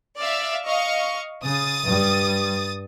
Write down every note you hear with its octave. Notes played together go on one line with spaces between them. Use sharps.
D5 E5 F5
D#5 F5 C#6
C#3 D#6 A6
G2 G3